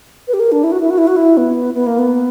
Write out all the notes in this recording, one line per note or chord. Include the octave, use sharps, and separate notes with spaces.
B4
G4
A#4
D4
E4
F#4
E4
F#4
E4
F#4
E4
B3
B3
A#3
B3